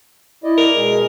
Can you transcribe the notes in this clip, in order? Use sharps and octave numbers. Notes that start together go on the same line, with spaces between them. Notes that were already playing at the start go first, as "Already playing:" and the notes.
E4 D5 D#5
A#4
B2 G#3 G#4